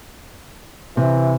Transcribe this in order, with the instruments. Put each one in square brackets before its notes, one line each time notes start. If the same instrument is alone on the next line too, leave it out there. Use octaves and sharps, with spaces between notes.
[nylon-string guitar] C3 [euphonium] E3